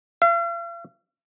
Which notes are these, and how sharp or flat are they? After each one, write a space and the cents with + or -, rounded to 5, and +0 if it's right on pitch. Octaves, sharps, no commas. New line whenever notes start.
F5 -45